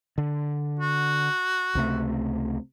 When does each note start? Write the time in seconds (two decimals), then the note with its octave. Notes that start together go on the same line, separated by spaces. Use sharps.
0.18 D3
0.79 F#4
1.75 C#2 C3 A3